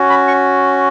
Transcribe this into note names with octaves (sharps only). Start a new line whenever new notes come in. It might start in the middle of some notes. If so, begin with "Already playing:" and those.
Already playing: C#4 F#4
B5
C#6